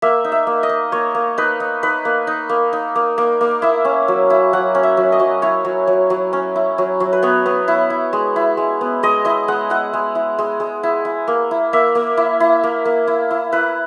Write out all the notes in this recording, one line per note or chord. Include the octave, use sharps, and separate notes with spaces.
A#3 E5
D#4
E5
A#3
D#5
D#4
A#3 C#5
A#3
D#4 B4
D#4
D#4 B4
A#3
D#4
A#3
D#4
A#3
A#3
A#3
E4 E5
C#4
F#3
E4
F#3 F#5
C#4
E5
F#3
D#5
F#3
E4 C#5
F#3
F#3
F#3
C#4
E4
F#3
F#3
B4
B3 C#5
B3
E4
E4
G#3
E4
G#3
B3
G#3 D#5
E4 D#5
G#3 F#5
E4 F#5
G#3
E4
G#3
G#3
E4
E4
A#3
E4
A#3 E5
A#3
E4
E4
A#3
A#3
E4
E4
E4 B4